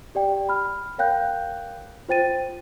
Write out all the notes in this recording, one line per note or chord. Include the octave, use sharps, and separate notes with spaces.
G4 D5 G5
B5 F6
A#4 C#5 F5 G5 F#6 G6
F4 C5 G5 A6 D#7